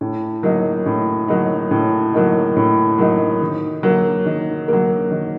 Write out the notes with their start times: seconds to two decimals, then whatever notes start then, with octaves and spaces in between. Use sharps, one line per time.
0.01 A2
0.43 F#3 A#3 D#4
0.86 A2
1.28 F#3 A#3 D#4
1.71 A2
2.14 F#3 A#3 D#4
2.57 A2
2.98 F#3 A#3 D#4
3.41 D#3
3.83 F#3 A#3
4.26 D#3
4.68 F#3 A#3
5.11 D#3